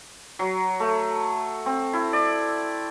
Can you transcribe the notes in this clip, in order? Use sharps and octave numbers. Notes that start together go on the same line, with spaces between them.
F#3
A3
C4
E4
D5